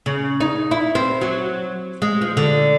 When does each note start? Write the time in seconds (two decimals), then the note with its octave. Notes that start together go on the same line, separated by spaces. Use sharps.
0.06 C#3
0.40 D#4
0.71 E4
0.95 C4
1.21 F#3
2.02 G#3
2.21 F3
2.37 D3